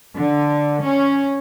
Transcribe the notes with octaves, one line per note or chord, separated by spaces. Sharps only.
D3
C#4